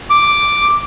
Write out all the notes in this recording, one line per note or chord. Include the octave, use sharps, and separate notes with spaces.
D6